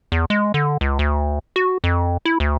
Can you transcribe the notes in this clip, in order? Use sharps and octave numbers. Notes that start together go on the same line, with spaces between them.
E2
G#3
D3
C#2
D2
F#4
F2
E4
D2